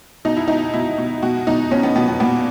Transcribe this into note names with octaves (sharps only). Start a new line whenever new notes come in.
B2 D#4
E4
B2 D#4
B2 E4
B2
B2 F#4
B2 D#4
B2 C#4
B3
B2 B3
B3
A#2 B3